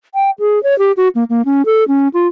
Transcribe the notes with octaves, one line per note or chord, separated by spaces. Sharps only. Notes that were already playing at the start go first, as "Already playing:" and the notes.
G5
G#4
C#5
G4
F#4
A#3
A#3
C#4
A4
C#4
F4